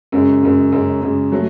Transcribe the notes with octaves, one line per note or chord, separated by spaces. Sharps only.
F#2 C#3 G#3
F#2 C#3 G#3
F#2 C#3 G#3
F#2 C#3 G#3
F#3 A3